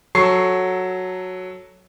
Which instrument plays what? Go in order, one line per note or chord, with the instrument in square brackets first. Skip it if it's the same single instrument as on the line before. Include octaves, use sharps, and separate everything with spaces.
[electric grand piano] F#3 A4 C#6 C7